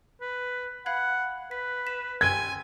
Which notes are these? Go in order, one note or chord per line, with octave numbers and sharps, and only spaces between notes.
B4
F5 F#5 B5 G#6
B4 B6
B6 E7
G5 G#5 C6 E6 G#6